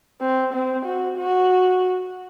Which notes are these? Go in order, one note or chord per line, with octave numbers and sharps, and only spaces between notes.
C4
C4
F#4
F#4